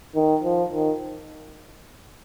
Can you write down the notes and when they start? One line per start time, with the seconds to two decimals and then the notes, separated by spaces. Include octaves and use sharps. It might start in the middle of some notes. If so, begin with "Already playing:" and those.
0.15 D#3
0.44 F3
0.73 D#3